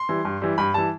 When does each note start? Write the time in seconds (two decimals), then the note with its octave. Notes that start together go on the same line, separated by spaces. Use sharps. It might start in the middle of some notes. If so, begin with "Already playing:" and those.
Already playing: C6
0.09 E3 G3
0.25 G2
0.42 E3 G3
0.58 G2 B5
0.74 E3 G3 A5